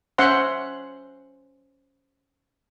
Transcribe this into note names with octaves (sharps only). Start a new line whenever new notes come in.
C#4 C5 E5 F#5 C6